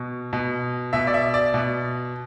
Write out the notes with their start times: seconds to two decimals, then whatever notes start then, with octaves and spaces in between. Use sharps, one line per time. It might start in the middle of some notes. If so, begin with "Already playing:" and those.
Already playing: B2
0.33 B2
0.93 B2 E5
1.07 D5
1.14 E5
1.34 D5
1.54 B2